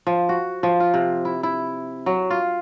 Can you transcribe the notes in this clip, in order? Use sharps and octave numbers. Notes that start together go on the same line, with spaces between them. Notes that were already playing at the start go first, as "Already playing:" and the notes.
F3
F#4
F3
F4
C3
E4
E4
F#3
F4